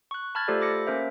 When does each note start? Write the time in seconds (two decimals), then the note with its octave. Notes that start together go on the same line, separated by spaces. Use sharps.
0.11 C#6 F#6
0.35 A5 B5 F6 G#6 A6
0.48 A3 F4 G4 A4 C5 D5
0.61 B5 D6 A#6 C#7
0.87 A#3 C#4 A#4 C5 E5